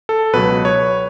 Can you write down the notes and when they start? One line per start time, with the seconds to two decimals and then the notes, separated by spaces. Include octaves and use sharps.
0.09 A4
0.33 C#2 B2 F#3 B4
0.65 C#5